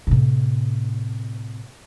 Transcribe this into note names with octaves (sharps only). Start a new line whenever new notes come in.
A2 C3